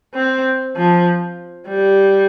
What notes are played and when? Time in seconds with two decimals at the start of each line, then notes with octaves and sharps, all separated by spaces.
0.14 C4
0.76 F3
1.68 G3